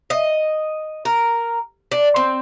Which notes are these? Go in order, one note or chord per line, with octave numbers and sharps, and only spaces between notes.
D#5
A#4
D4
C4